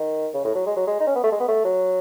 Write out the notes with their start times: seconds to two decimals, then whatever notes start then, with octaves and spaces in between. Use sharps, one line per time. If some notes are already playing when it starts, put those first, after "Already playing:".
Already playing: D#3
0.34 C#3
0.45 A2
0.55 F#3
0.66 G#3
0.76 F#3
0.87 G#3
1.00 D#4
1.07 C#4
1.16 B3
1.23 A3
1.32 G#3
1.40 B3
1.48 A3
1.65 F#3